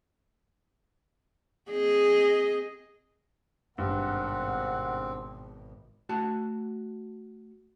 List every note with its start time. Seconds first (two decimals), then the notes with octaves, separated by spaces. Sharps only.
1.71 C4 G#4 D#5
3.78 G#1 G2 B2 C4 F#5
6.09 A3 F#4 A5